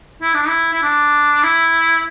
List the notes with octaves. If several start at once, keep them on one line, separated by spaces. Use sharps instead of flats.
E4
D4
E4
E4
D4
E4